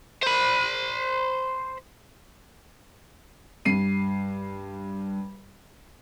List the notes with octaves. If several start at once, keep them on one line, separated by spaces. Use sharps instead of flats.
C5 B5
G2 C7 D#7